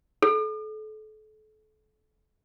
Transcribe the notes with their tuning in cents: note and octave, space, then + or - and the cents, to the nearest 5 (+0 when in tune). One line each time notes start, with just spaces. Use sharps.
A4 -35